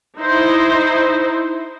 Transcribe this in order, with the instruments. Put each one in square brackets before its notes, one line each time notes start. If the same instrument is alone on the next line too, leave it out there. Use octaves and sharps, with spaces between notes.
[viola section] D#4 E4 C5